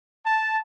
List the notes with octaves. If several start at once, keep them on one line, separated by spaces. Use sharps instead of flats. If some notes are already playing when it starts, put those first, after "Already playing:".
A5